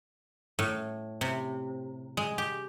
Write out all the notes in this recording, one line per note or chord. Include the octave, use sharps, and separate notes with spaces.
A2
C3
G#3
G4